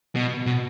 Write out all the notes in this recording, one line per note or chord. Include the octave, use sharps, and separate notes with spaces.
B2
B2